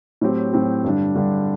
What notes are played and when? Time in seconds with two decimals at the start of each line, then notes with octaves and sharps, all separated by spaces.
0.21 A2 F#3 C4 G4
0.53 A2 F#3 C4 G4
0.84 G2 D3 G3 D4
1.15 G2 D3 G3 D4